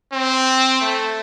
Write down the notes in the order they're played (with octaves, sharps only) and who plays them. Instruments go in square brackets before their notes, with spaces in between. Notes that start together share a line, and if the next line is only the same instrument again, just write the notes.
[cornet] C4
A3